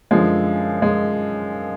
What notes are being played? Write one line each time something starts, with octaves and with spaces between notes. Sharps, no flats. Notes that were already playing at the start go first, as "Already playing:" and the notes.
F#2 D3 F3 G#3
G#3